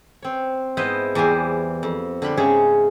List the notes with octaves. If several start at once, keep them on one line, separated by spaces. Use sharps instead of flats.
C4 C#5
G#2 B3 E4 B4 C5 D#5
E2 E3 G3 C5 G#5
F2
D3 G3 B5 C6
G#2 C#3 C#4 G#4 C#5 E5